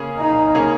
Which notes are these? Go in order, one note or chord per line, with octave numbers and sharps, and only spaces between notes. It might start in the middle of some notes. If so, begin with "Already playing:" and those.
Already playing: C#3 A#3 C#4 G#4
D#4
C#3 A#3 C#4 G#4